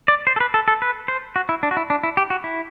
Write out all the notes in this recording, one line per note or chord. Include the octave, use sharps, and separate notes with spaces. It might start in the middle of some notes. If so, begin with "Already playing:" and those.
D5
C5
A4
B4
A4
A4
B4
C5
F#4
E4
D4
F#4
E4
D4
E4
G4
F#4
E4